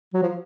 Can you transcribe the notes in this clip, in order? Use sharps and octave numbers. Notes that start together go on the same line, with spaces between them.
F#3
F3